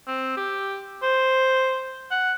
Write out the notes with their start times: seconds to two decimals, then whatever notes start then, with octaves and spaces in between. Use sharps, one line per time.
0.07 C4
0.37 G4
1.03 C5
2.11 F#5